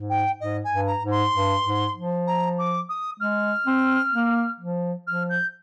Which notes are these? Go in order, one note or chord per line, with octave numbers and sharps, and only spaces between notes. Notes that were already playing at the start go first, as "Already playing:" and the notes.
Already playing: G#2
G5
G#2 D#5
G#5
G2
A#5
G#2
C6
G2
G#2
F3
A#5
D6
D#6
G#3 F6
C4
A#3
F3
F3 F6
G6